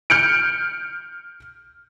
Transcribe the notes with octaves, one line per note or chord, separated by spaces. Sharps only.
F6 G6 C#7 D7